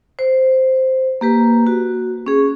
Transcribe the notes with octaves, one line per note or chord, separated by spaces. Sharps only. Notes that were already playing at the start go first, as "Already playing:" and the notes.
C5
A#3 G4 B4
F#4
C#4 G#4